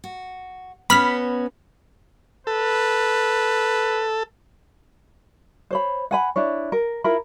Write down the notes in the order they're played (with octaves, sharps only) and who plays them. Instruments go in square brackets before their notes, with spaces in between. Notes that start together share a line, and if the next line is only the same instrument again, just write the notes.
[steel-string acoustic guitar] F#4
[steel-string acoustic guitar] B3 C#4 F#4 [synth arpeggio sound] B5 F6 B6
[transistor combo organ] A4 [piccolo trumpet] B4
[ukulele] C5 C#5 B5
F#5 G#5 B5
D4 E4 C#5
A#4
E4 F4 A#4 B5